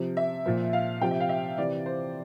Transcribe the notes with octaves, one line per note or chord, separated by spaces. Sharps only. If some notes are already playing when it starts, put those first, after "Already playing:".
Already playing: C3 F3
E5
A#2 F3
F5
C3 F3 G5
E5
F5
E5
C3 E3 D5
C5